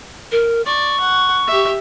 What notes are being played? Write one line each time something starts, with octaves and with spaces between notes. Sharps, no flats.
A#4
D5 C#6
F#5
G4 E5